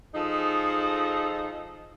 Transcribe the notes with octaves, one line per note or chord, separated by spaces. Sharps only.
F3 D#4 G#4 A4